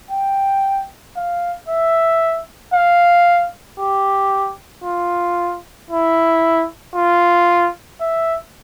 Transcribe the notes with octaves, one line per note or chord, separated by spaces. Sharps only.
G5
F5
E5
F5
G4
F4
E4
F4
E5